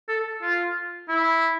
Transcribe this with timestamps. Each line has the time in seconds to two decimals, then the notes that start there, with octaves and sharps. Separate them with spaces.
0.09 A4
0.42 F4
1.09 E4